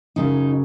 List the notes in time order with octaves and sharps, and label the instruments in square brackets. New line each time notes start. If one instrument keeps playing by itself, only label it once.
[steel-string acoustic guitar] F#2 C#3 F#3 D#4